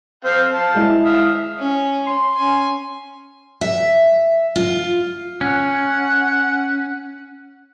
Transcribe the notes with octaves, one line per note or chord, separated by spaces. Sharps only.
C4 F5 G5
F5 A5
G#3 E4
E5 F5 D#6
C#4
C6
C#4 G#5
E5
F4
C#4 F#5